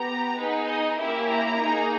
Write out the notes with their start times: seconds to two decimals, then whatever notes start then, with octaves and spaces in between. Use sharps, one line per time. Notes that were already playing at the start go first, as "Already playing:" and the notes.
Already playing: B3 G4 A#5
0.37 B3 D#4 G#4 B4
0.68 D#5
0.99 A#3 C#4 E4 G4 E5
1.30 A#5
1.61 A#3 D#4 G#4